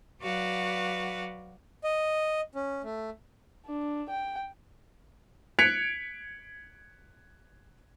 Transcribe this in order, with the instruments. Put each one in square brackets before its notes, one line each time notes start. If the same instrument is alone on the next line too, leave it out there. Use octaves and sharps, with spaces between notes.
[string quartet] F#3 F#4 B4 D5 F5 F#5
[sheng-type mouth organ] D#5
C#4
A3
[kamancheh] D4
G5
[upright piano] F#6 G#6 B6 C#7 D7 F7